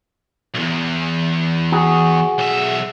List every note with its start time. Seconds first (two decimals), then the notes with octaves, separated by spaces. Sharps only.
0.55 B1 E2
1.72 F#4 G#4
2.39 B1 E5